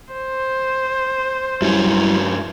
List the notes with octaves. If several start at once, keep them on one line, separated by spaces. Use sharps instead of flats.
C5
G2 F#3 G3 C#4 E4